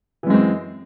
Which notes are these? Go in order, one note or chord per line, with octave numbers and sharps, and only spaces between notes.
F#2 E3 G#3 C4